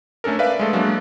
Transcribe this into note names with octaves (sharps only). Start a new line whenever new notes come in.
A3 C#4 D4 A4 A#4
B4 D5 E5 F5
G#3 A3 A4
F#3 G#3 A#3 D4 F#4